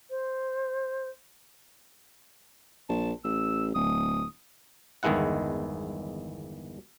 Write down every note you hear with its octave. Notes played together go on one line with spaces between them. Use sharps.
C5
A#1 A5
A1 E6
D1 D#6
G1 E2 D#3 G#3 E4 F#5